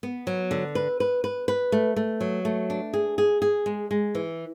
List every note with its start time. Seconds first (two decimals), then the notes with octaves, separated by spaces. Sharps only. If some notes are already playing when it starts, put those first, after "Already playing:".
0.03 B3
0.27 F#3
0.51 D3
0.75 B4
1.00 B4
1.24 B4
1.48 B4
1.72 A3
1.96 A3
2.21 F#3
2.45 A3
2.70 D4
2.93 G#4
3.18 G#4
3.42 G#4
3.66 G#3
3.91 G#3
4.15 E3